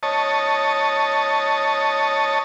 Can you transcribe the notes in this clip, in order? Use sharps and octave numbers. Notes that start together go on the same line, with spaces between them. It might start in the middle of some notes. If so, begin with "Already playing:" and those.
C#5 D#5 A5